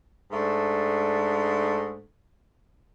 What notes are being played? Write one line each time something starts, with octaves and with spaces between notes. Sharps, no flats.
G#2 A3 D4